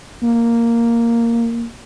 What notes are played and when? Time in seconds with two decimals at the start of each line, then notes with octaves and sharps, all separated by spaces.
0.23 A#3